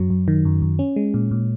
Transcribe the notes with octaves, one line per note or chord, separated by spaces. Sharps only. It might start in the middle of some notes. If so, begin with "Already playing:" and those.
Already playing: F#2 F#3
F#2
D#3
F#2
F#2
C#4
G#3
A#2
A#2